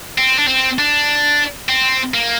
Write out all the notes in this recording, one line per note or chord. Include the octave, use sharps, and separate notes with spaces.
C4
D4
C4
D4
C4
A#3